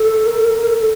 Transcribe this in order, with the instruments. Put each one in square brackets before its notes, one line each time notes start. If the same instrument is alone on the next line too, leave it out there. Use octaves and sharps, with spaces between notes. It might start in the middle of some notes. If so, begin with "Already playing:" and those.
Already playing: [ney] A4
A#4
A4
A#4
A#4
A4
A4